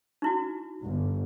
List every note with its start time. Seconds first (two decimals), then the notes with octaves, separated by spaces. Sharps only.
0.22 D#4 E4 F#4
0.82 G1